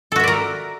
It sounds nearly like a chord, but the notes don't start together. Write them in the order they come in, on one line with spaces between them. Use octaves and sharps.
A4 F#4 E5 D5 A#4